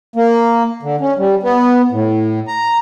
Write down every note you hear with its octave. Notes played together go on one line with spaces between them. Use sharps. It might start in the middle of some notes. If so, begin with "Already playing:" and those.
A#3
D3
C#4
G3
B3
A2
A#5